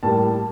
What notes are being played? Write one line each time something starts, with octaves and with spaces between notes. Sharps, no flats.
A2 G3 A#3 A5